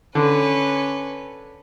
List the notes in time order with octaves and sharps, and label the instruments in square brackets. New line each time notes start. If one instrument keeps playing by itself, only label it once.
[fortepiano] D3 [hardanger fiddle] C#4 B4